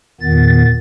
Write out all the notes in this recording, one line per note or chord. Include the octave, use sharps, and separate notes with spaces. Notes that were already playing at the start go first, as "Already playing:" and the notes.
E2 A#2 D#3 B3 A6